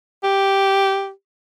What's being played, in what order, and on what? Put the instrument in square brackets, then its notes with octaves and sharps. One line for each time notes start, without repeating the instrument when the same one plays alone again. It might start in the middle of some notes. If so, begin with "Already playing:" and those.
[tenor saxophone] G4